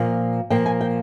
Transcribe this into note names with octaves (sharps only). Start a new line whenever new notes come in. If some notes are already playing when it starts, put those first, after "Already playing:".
Already playing: A#2 F3 A#3
A#2 F3 A#3 G5
G#5
G5